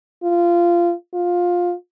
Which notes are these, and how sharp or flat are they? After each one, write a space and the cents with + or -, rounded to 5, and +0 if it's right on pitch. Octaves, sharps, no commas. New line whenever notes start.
F4 -20
F4 +15